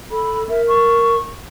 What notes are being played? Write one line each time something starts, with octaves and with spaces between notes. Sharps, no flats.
A4 B5
A#4 E5
C#6